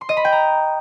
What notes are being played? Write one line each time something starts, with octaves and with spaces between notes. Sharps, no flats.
C6
D#5
B5
G5
A#5